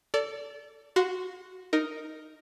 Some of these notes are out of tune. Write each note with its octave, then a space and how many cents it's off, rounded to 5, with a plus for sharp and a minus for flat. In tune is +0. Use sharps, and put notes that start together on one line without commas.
A4 +20 D5 -25
F#4 +0 F#5 -45 C6 -10
D#4 +0 A#4 +0